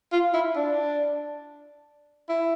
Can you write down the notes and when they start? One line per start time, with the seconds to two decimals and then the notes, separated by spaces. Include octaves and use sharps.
0.12 F4
0.34 E4
0.56 D4
2.29 E4